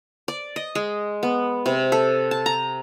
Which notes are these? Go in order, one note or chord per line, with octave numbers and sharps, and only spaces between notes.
D5
D#5
G#3
B3
C3
A4
A5
A#5